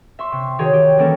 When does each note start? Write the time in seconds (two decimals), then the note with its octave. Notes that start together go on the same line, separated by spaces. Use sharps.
0.19 E5 C6 C#6
0.32 C3
0.59 D#3 F#4 G#4 C#5
0.73 G4
0.98 E3 F#3 G3 A#3 C#4 A4